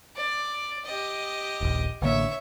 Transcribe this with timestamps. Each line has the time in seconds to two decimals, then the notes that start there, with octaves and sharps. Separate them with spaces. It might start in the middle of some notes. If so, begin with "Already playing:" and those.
0.16 D5
0.85 G4 D#5
1.61 D#1 A#1
2.02 A1 D3 A#3 C#5 E5